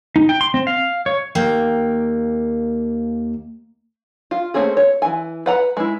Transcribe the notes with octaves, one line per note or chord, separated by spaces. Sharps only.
D#4
G5
C6
C4
F5
C#5
D#2 A#3 G5
F4
A3 A#3 C4 C#4 G#4
C#5
E3 G#5
B4 F#5 A#5
G#3 E4